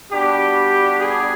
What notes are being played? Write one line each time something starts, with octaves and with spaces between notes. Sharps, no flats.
G3 B3 D4 F#4 G4
G#4